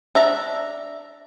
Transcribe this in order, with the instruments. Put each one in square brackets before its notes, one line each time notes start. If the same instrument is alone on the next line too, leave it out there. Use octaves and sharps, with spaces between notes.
[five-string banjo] D4 E5 A#5